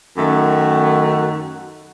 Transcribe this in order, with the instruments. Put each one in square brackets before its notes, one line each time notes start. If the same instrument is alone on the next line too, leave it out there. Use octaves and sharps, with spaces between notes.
[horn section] F#2 D#3 A3 F#5